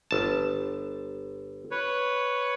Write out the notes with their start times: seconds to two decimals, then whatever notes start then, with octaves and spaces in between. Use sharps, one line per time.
0.11 G1 A5
1.71 B4 C#5